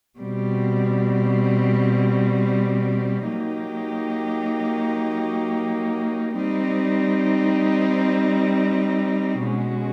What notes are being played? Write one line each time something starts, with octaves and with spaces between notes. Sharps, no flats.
B2 G3 C4
F#3 A#3 D#4 G4
G3 C4 D#4
B2 G#3 C#4 F#4